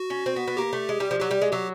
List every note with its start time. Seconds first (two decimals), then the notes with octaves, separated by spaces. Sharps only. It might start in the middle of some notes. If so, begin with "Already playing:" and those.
Already playing: F#4
0.10 C#4
0.26 C4
0.36 B3
0.48 B3
0.57 A#3 G4
0.73 A3
0.89 G#3
1.00 G3
1.11 F3
1.20 F#3 G4
1.31 G3
1.42 G#3
1.52 F#3 G4